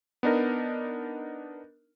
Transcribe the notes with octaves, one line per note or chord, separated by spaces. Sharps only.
B3 D4 D#4 A#4